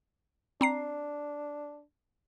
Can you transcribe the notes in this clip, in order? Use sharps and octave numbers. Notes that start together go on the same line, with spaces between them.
C4 D4 A#5 C7